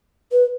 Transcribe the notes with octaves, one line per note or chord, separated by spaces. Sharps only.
B4